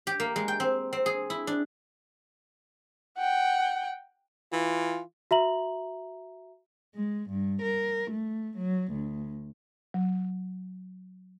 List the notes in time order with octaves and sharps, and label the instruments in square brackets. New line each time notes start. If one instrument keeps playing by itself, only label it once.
[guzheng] G4
A#3
G#3
G5
C4
C4
G#4
E4
D4
[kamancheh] F#5 G5
[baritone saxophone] E3 [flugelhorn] F4
[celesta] F#4 E5 A#5 F#7
[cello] G#3
G2
A#4
A3
F#3
D2
[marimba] F#3